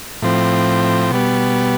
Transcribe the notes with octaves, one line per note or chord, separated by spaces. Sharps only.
A2 F3 C4
B2 G3 B3